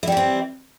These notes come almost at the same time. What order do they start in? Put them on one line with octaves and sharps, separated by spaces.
E4 G3 E3 C4